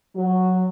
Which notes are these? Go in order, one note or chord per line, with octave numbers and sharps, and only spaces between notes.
F#3